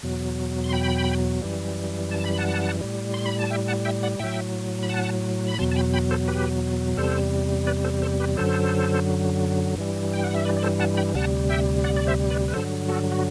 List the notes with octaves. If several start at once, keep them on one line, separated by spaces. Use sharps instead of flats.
E2 B2 F#3
C6
G5 B5
F#2 E3 G3
A5
B5
F#5 A5
A2 G3
C6
B5
A5
E5 G5
F#5 A5
E5 G5
D5 F#5
A2 F#3 E5 G5
B5
F#5 A5
B5
E2 B2 F#3 A5 C6
A5
G5 B5
G5 B5
A4 C5
G4 B4
E2 C3 G3 A4 C5
B4 D5
A4 C5
A4 C5
G4 B4
F#2 D3 F#3 A4 C5
G2 E3 G3
G5
F#5
E5
B4 D5
D5
A4 C5
F#5 A5
G5 B5
D2 C3 G3 F#5 A5
E5 G5
D5 F#5
D5
C5 E5
B4 D5
B4
G2 D3 F#3 A4 C5
F#4 A4
F#4